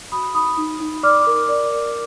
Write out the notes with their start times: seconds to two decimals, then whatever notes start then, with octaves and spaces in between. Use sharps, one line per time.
0.12 F#4 B5 D#6
0.34 D#4 B5 D#6
0.57 D#4
0.80 D#4
1.03 D5 D6 F6
1.27 A#4
1.49 D5
1.72 D5